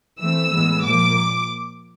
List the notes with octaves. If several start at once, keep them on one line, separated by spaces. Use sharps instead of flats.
E3 A3 C4 E6
A2 E3 G#3 B3
A#2 F3 A#3 D6